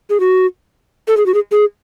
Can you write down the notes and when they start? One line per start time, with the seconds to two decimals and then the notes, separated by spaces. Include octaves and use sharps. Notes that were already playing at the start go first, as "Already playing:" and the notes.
0.10 G#4
0.20 F#4
1.08 A4
1.17 G#4
1.26 F#4
1.34 G#4
1.52 G#4